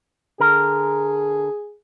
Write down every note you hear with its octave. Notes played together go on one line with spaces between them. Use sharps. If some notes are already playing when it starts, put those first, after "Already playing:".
D3 G#4 A#4